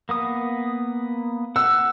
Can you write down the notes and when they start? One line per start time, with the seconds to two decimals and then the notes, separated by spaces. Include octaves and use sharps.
0.09 A#3 B3 D#6
1.56 F#5 E6